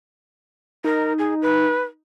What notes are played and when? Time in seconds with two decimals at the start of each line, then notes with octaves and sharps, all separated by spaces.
0.84 D#4 A#4
1.18 G#4
1.42 B4